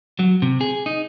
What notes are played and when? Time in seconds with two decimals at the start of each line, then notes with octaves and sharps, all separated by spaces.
0.19 F#3
0.42 C3
0.61 G#4
0.86 D#4